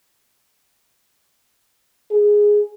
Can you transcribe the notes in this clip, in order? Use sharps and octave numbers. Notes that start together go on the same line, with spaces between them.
G#4